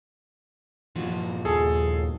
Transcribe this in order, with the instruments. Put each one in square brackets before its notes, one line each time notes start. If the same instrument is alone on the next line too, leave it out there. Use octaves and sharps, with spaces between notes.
[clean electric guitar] G2 A#2 F#4 [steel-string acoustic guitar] F3
[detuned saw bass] D#2 [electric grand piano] G#4 A4